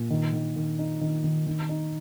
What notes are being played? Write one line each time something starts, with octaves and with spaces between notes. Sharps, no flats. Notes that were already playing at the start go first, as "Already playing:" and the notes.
Already playing: A#2
D#3
D#3
D#3
D#4
D#3
D#3
D#3
D#4